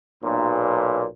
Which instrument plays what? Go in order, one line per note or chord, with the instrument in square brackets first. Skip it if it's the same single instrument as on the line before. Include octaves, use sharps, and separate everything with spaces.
[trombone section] B1 A#2